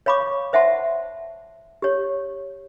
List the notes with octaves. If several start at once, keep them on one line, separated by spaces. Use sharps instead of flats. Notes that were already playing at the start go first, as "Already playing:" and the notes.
C#5 F5 B5 C#6 D6
C5 E5 F#5 A5 C6
G4 C#5